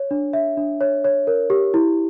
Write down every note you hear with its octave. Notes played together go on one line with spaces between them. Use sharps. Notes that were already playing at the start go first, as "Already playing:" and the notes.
Already playing: C#5
D4
E5
D4
C#5
C#5
A#4
G4
E4